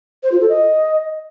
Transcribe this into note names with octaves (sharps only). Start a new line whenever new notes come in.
C5
F4
A4
D#5